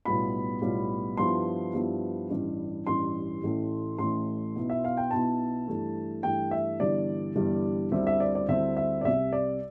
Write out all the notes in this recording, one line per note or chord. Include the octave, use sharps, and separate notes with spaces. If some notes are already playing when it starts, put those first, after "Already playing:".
B1 A2 G3 B3 F4 B5
B1 A2 G3 B3 F4
G2 F3 B3 E4 C6
G2 F3 B3 E4
A1 G2 E3 G3
A1 G2 E3 G3 C6
A1 A2 E3 A3
A1 A2 E3 A3 C6
B1 B2 B3 E4
E5
F5
G5
B1 B2 B3 E4 A5
G2 E3 A3
G2 E3 A3 G5
E5
G1 G2 E3 G3 D5
G1 G2 E3 G3
D2 D3 G3 C4 E4 E5
E5
D5
D5
D2 D3 G3 C4 E4 E5
E5
D5
C2 C3 G3 E5
D5